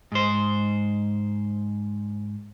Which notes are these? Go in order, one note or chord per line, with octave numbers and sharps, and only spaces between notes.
G#2 C5